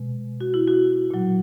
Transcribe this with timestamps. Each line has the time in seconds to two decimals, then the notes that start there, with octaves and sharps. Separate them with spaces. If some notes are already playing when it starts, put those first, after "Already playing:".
Already playing: B2 G#3
0.41 F#4
0.54 E4
0.68 F#4
1.10 A#2 F#3